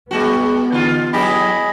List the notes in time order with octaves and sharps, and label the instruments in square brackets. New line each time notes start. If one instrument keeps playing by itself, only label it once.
[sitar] G3 G#3 F#4 [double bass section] B3
[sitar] D3 F4
[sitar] F#3 E4 G4 [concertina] G#4 D#5 B5